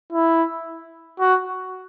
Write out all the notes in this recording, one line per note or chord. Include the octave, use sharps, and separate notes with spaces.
E4
F#4